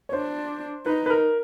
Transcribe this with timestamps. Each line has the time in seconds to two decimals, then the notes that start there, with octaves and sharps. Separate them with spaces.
0.09 C#5
0.13 D4 C5
0.86 D#4 B4
1.06 B4
1.10 A#4